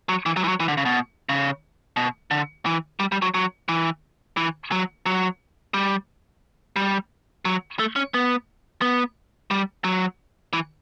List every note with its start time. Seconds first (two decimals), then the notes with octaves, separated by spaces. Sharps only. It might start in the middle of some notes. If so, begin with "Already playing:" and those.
0.09 F#3
0.26 E3
0.37 F#3
0.44 E3
0.48 F#3
0.60 E3
0.68 D3
0.77 C#3
0.85 B2
1.29 C#3
1.97 B2
2.31 D3
2.66 E3
3.00 G3
3.12 G3
3.22 F#3
3.34 F#3
3.69 E3
4.37 E3
4.72 F#3
5.06 F#3
5.74 G3
6.76 G3
7.45 F#3
7.79 A3
7.96 C#4
8.14 B3
8.82 B3
9.51 G3
9.84 F#3
10.53 E3